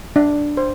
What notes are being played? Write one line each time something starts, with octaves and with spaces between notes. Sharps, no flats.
D4
C5